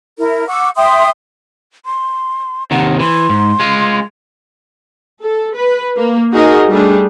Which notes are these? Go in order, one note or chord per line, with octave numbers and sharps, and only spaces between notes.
E4 A#4
F#5 C#6 D6 E6
E5 G5 C6 D#6
C6
D#2 C3 D#3 F#5
E3 C6
G#2
G#3 F4
A4
B4
A#3
D#4 F#4 G#4 A#4 D#5
G3 A3 D4 G#4